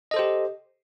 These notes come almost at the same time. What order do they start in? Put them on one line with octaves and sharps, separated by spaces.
D#5 A4 C5 G4